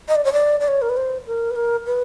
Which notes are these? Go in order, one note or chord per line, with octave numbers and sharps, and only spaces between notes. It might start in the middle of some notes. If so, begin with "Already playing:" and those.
D#5
D5
C#5
D5
D5
C#5
A#4
B4
C5
A#4
B4
A#4
B4